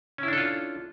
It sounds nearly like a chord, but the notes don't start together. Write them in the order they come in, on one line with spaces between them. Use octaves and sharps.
C#4 E4 D4 A4 F4